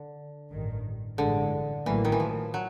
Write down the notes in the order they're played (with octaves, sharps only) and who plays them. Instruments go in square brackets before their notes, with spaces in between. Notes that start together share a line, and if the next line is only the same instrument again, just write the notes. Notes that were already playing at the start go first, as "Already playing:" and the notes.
Already playing: [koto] D3
[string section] A1 G2 D#3
[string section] A1 G2 E3 G#3 [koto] D3
[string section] A1 A2 F#3 A#3 [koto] E3
[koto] D#3
E3
F3
F#3